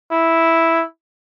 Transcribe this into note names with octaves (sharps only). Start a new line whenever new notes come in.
E4